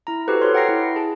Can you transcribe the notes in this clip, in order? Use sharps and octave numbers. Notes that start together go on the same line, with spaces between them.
E4 A#5
F#4 G4 A4 B4 C5
A4 C#5 C6 F6
F#5 G5 A#5 A#6 C7
E4
G#4 A5